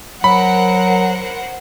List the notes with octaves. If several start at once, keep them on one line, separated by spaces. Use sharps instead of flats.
F#3 A#4 C5 F#5 B5